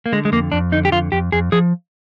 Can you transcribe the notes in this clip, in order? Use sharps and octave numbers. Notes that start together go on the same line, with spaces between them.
A#3
D3 G#3
G#3
F2 A#3
F2 D4
D3 D#4
G4
F2 F4
F2 G4
F2 G#4
F3 G#4